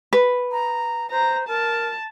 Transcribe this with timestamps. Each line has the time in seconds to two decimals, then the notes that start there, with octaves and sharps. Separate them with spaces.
0.13 B4
0.52 A#5
1.11 C5 A#5
1.48 A#4 A5